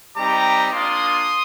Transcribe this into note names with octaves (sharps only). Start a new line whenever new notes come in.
G3 C4 D#4 G4 A#5 D6
A#3 D4 F4 C6 D#6